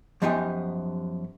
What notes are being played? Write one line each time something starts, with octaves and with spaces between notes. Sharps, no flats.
F#2 F3 B3 D#4 G4 G#5